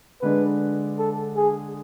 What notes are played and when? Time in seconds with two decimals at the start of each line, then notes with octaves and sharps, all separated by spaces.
0.22 D3 G#3 D4 B4
0.98 A4
1.37 G#4